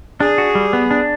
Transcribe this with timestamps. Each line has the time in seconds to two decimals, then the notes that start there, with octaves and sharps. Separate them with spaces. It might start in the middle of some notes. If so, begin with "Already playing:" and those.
0.20 D4 G#4
0.38 F#4
0.55 G3
0.73 B3
0.91 D4